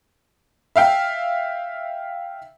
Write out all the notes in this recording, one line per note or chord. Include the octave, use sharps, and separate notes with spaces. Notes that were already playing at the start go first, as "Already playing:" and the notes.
E5 F5 G5